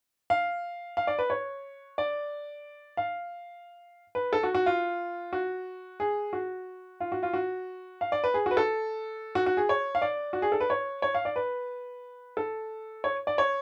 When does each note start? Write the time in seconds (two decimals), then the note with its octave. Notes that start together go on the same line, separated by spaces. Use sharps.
0.30 F5
0.97 F5
1.07 D5
1.19 B4
1.30 C#5
1.98 D5
2.97 F5
4.15 B4
4.33 A4
4.43 F#4
4.55 F#4
4.66 F4
5.33 F#4
6.00 G#4
6.33 F#4
7.00 F4
7.12 F#4
7.23 F4
7.34 F#4
8.01 F5
8.12 D5
8.24 B4
8.34 G#4
8.46 F#4 B4
8.57 A4
9.35 F#4
9.46 F#4
9.57 G#4
9.69 C#5
9.95 F5
10.02 D5
10.33 F#4
10.42 G#4
10.52 A4
10.60 B4
10.70 C#5
11.02 C#5
11.15 F5
11.25 D5
11.36 B4
12.37 A4
13.04 C#5
13.27 D5
13.38 C#5